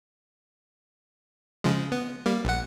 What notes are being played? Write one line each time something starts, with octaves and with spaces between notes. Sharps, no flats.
C#3 F3 G#3
B3
G3 A#3
A#1 F#5